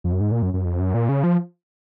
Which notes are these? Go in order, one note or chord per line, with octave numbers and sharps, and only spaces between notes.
F2
F#2
G#2
A#2
F#2
F#2
F2
F#2
A#2
C#3
F3